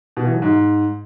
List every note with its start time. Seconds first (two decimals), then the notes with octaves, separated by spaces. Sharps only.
0.17 B2
0.25 E3
0.34 F#3
0.42 G#2